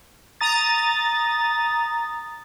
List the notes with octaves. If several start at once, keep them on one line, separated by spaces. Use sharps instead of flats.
A#5 D#6 A6